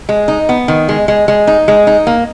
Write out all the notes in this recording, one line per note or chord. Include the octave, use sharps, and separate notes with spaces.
G#3
D#4
B3
D#3
G#3
G#3
G#3
D#4
G#3
D#4
A#3